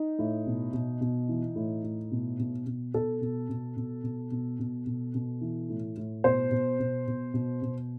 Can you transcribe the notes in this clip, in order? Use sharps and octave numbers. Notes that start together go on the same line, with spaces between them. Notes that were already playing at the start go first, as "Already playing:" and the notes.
Already playing: D#4
A2
B2
B2
B2
E3
A2
A2
B2
B2
B2
B2 A4
B2
B2
B2
B2
B2
B2
B2
B2
E3
A2
A2
B2 C5
B2
B2
B2
B2
B2